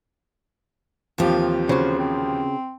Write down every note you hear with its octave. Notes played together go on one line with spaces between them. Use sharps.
D#2 C3 E3 F3 F4 G4
C#3 F#4 C5
C4